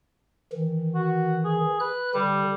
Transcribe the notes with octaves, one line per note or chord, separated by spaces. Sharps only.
D#3 E3
F#4
G#4
B4 F#6
D3 G3